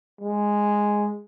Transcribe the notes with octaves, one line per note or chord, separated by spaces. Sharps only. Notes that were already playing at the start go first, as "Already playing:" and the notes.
G#3